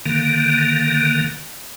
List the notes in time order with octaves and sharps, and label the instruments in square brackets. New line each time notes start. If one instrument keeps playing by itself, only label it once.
[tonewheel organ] D3 D#3 A#3